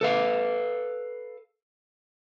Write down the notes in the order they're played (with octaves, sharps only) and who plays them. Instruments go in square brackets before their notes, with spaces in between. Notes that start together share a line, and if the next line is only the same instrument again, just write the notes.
[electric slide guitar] A4 B4 F5